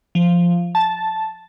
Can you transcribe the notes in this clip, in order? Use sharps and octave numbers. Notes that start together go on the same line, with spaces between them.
F3
A5